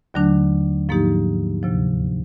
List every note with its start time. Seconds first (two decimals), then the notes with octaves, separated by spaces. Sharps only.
0.14 D#2 D3 F#3 A3 D4
0.89 G#2 F3 A#3 D#4 G4
1.63 D2 C3 F3